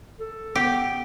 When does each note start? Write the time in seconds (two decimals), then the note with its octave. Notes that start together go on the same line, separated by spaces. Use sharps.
0.20 A4
0.55 B3 G4